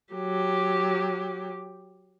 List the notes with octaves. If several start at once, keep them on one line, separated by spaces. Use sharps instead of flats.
F#3 G4